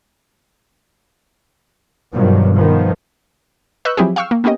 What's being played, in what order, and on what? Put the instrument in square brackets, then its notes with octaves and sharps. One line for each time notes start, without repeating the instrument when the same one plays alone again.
[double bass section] G2 B2 D#3 F3 F#3
D#3 F3 B3
[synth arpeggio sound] B4 D#5 C#6 E6 F#6 G6
F3 F#3 C4 E4 G4 G#4
F5 G5 C#6 E6 F6
A#3
A#3 B3 C#4 G4 D#5